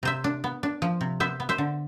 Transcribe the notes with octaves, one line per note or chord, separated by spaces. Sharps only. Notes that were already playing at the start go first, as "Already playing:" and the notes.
C3 C5 E5
D4
B3
D4
F3
C3
B3 C5 E5
B3
C5 E5
D3